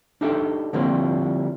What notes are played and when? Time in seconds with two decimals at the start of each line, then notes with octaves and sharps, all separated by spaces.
0.21 D4 D#4 G4 A4 E5
0.73 D3 F3 G3 A#3 C4 E4